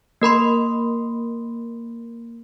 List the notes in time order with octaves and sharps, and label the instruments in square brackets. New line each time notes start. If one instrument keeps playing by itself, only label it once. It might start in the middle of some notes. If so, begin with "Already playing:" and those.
[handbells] A#3 A#4 B5 C6